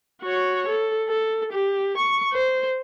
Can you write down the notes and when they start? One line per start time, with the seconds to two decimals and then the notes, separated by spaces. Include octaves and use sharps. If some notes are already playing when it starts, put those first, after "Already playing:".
0.23 F#4 C#5
0.68 A4
1.08 A4
1.52 G4
1.97 C#6
2.33 C5